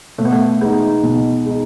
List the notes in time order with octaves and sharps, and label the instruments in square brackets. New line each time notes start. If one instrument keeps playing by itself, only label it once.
[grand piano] B2 [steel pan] A3
[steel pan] B3
A3
[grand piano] G#3 D#4 [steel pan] B3
[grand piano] B2
G#3 D#4